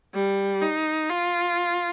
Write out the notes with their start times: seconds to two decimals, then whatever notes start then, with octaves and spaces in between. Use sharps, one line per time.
0.14 G3
0.62 D#4
1.10 F4